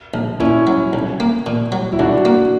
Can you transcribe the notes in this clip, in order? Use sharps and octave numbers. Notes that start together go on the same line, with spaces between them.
A#1
A#2 C#4 E4
F#3
B1
A#3
A#2
F#3
E4
B1 D4 F#4
A#3